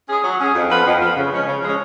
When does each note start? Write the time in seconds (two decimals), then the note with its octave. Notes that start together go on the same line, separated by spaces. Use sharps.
0.08 C#4 G#4
0.24 F#3
0.39 C#4 G#4
0.54 F2
0.70 F3 B3 F4 B4
0.85 F2
1.01 F3 B3 F4 B4
1.16 C#3
1.31 F3 G#3 C#4
1.46 C#3
1.61 F3 G#3 C#4